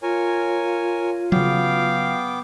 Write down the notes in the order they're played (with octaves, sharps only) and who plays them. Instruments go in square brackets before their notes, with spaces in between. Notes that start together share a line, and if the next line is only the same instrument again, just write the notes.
[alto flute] F4 [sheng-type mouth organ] A#4 C#5 G#5
[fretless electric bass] C#3 F#3 [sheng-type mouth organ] B3 G5 D6 [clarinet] F5